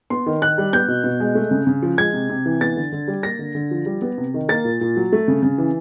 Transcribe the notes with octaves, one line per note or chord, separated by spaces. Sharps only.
B3 C6
D#3
D#3 F#6
G3
B3 G6
B2
B2
G#3
A3
C#3
C#3
F3
G#3 G#6
C3
C3
E3
B3 A6
D3
D3
G3
A#3 A#6
D3
D3
F3
G3
B3
C3
D#3
A#3 A6
A#2
A#2
F#3
A3
C#3
C#3
E3